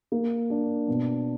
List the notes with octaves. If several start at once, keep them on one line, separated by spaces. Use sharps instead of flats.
A#3
D4
B2